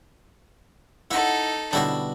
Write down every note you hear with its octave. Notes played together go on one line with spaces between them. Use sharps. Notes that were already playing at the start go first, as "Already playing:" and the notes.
D#4 E4 A4 F#5 B5
B2 D3 G3 D4 E4 F#4